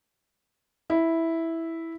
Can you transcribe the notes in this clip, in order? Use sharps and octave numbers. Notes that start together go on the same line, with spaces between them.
E4